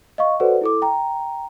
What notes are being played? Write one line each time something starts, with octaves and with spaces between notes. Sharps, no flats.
D#5 F5 C#6
F#4 A4 B4 C5 D5 F#5
E4 A4 D6
G5 A#5